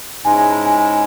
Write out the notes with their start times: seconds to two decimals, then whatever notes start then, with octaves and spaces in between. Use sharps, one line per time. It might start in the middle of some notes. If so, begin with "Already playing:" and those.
0.25 G#2 G#3 C#4 E4 G#5
0.38 G#5
0.52 A5
0.66 G#5
0.78 G#5